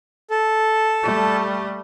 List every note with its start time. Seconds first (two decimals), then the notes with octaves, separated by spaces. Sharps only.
0.30 A4
1.03 G3 A3